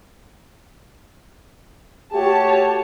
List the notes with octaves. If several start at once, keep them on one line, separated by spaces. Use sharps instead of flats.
A3 F#4 G4 C#5 A5